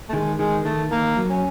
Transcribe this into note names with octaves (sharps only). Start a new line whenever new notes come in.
A3
D#3 G#3
D#3 G#3
D#3 A3
D#3 A#3
F#3
C#4